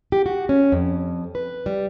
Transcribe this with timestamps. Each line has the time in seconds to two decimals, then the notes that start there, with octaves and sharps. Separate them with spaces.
0.12 G4
0.26 F#4
0.49 C#4
0.72 F2
1.35 B4
1.66 G3